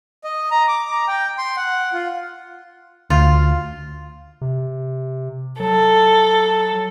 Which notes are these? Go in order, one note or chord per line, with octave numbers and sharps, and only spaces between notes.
D#5
A#5
D6
A#5
G5
C6
F#5
F4
D2 F4
C3
F#3 A4